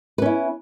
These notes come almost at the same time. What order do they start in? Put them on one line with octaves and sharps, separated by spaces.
B4 C#4 E4